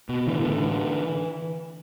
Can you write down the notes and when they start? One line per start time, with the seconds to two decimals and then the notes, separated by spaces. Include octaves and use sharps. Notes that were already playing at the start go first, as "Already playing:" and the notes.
0.09 B2
0.27 A2 D3 E3
0.39 D3 E3
0.46 A2
0.51 D3 E3
0.64 A2